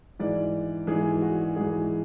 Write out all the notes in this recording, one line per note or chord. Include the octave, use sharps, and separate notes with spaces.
G#2 E3 D5
G#2 E3 G#4
F#4
G#2 E3 G#4